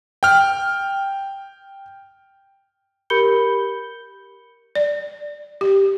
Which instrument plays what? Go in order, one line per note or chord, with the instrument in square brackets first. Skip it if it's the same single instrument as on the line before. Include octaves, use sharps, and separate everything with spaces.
[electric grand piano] G5 F6
[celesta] G4 A#4 B5 G6 C#7 G7
[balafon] D5
G4